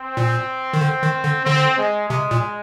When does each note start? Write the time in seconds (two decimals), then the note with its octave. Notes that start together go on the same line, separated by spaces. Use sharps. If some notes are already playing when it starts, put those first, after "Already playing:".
Already playing: C4
0.17 A#2
0.73 D#3
0.81 D3
1.03 D#3
1.24 D3
1.45 D3 C4
1.78 G#3
2.09 C3 G#3
2.31 A#2